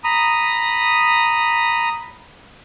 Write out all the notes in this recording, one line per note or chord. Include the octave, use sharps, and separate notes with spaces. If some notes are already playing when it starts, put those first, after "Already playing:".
A#5 B5 D#6